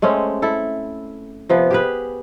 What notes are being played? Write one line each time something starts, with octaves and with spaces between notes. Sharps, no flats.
G#3 A3 C4 C#4
E4 A4
C3 F3 B3
G4 G#4 B4